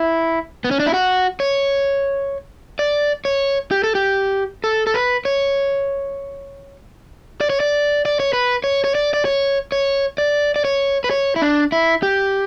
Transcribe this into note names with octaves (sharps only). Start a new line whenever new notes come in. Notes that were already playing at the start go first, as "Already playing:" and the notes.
Already playing: E4
B3
C#4
D4
E4
F#4
C#5
D5
C#5
G4
A4
G4
A4
A4
B4
C#5
D5
C#5
D5
D5
C#5
B4
C#5
C#5
D5
D5
C#5
C#5
D5
D5
C#5
B4
C#5
E4
D4
E4
G4